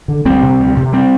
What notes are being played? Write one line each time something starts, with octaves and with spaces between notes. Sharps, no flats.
D3
D2 G3 C4
C3
D2
C3
G3 C4